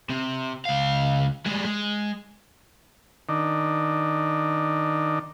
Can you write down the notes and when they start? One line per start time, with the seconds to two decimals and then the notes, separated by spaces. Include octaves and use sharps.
0.09 C3
0.65 C#2 F5
1.46 G3 G#3
1.65 G#3
3.29 D#3 D4